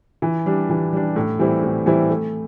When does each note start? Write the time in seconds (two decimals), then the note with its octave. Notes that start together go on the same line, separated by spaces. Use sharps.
0.22 E3
0.46 G3 D4
0.69 E3
0.93 G3 D4
1.16 A2
1.39 E3 G3 C4 E4
1.63 A2
1.86 E3 G3 C4 E4
2.10 A3